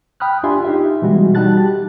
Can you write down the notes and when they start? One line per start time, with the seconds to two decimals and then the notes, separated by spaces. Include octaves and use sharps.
0.20 G5 B5 D#6 F6 F#6
0.43 D4 F4 G4 E5 G#5 C6
0.64 D#4 G4 E5
1.02 B2 E3 G3 G#3 F#4
1.35 G3 D#4 F#4 A5 F#6 A6
1.57 G4